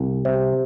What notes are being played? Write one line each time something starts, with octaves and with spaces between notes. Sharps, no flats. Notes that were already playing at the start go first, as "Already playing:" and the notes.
Already playing: C2
C3